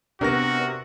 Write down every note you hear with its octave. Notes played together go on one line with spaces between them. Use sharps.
C3 B3 D4 F#4 A#4 A#6